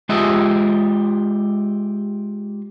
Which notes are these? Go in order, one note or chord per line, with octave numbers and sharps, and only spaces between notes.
G#3 F4 G4 D#5 E5